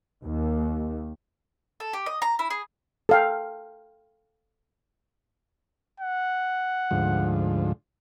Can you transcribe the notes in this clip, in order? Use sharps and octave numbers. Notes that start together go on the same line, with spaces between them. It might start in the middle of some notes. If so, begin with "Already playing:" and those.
D#2
A4
G4
D#5
A#5
E4
G#4
A4 F5 G5
F#5
D2 G#2 F3